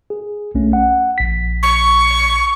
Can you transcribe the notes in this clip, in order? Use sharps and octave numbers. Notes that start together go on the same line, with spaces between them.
G#4
B1 A3 C#4
F#5
A#1 B6
C#6